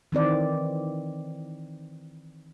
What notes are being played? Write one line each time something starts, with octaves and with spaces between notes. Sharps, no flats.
D#3 E3 C4 D5